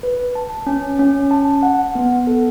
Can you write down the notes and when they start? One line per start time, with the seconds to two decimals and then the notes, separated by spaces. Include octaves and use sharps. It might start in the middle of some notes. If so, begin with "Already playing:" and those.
0.03 B4
0.35 A5
0.66 C#4
0.99 C#4
1.31 A5
1.63 F#5
1.95 B3
2.27 A4